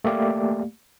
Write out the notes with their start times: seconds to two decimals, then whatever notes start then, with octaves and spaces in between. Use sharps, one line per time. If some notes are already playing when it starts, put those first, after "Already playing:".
0.04 A3 A#3 G4 D5 F5